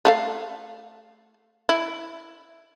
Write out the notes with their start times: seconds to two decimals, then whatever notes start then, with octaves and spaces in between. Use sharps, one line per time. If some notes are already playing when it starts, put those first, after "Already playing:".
0.05 A3 A4 F5
1.69 E4